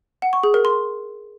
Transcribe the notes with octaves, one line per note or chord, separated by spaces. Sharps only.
F#5
C#6
G#4
A#4
C6